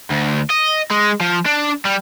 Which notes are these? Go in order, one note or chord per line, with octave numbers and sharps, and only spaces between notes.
D2
D#5
G#3
F3
D4
G3